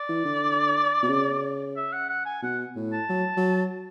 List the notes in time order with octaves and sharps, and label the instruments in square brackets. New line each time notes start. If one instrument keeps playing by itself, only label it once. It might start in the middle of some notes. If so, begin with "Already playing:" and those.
Already playing: [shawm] D5
[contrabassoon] E3
D3
B2
C#3
[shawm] E5
F#5
F#5
G#5
[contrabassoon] B2 [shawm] F#5
[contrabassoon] A2
[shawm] A5
[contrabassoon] F#3
F#3